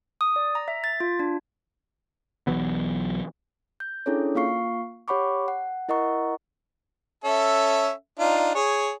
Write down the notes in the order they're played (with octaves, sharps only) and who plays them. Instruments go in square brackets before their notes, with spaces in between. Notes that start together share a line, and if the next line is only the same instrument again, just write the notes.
[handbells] D#6
D5
A#5
E5
A6
F4
D4
[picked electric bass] B1 E3 F#3 B3
[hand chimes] G6
C#4 D4 E4 G#4 A4 C#5
A#3 F4 F5 C#6 C7
G4 C#5 F#5 B5 C#6 D6
F#5
E4 A#4 D#5 F#5 A#5 C#6
[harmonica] C#4 A4 E5
D4 D#4 F4
G#4 C#5